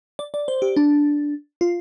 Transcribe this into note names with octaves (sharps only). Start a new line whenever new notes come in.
D5
D5
C5
G4
D4
F4